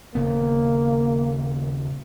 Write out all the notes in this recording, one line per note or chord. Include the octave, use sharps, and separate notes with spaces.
D#1 C#3 A#3 B3